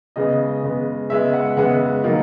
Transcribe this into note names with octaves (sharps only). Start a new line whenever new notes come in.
C#3 G#3 B3 D#5
C#3 G#3 B3
C#3 G#3 B3 E5
F#5
C#3 G#3 B3 F#5
D#3 F#3 A#3